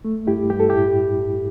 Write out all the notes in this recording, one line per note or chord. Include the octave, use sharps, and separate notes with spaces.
A3
G2 E4 G4
G2 G4
A4
A2 E4 G4